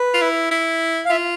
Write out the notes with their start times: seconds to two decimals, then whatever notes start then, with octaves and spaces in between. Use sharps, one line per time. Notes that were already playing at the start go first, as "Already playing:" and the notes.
Already playing: B4
0.14 F4
0.22 E4
0.51 E4
1.05 F5
1.10 F4 E5